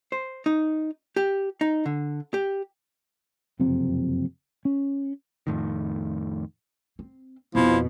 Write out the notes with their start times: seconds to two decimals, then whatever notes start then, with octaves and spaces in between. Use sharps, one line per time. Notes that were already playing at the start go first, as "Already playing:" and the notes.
0.12 C5
0.46 D#4
1.16 G4
1.61 D#4
1.86 D3
2.34 G4
3.60 F#1 F2 C3 C4
4.65 C#4
5.47 F2 A2 D#3
6.99 C4
7.55 F2 B2 F3 E4